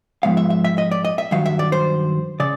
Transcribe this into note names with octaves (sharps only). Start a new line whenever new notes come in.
G#2 F3 G#3 B3 F5
E5
E5
E5
D#5
D5
D#5
E5
G2 D#3 F#3 F5
E5
D5
C5
C#3 D5